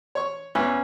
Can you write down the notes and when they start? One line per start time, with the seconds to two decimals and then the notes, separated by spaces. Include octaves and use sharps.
0.15 C#5 C#6
0.55 E2 C#4 B4 E5